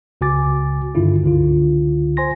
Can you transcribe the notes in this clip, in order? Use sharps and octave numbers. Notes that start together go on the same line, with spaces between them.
C#2 C#3 F#4 G#5 D6 A6
G2 D3 D#3 E4 F4
C#2 D3 F4
C5 G#5 C6 A#6